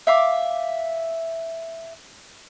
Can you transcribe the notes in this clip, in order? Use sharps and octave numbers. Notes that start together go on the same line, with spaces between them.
E5 F5 D6